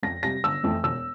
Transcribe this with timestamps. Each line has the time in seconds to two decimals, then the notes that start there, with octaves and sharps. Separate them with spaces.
0.03 F2 A#6
0.23 C3 G3 A#6
0.43 G1 E6
0.64 F2 E3 A3 E4
0.83 E1 E6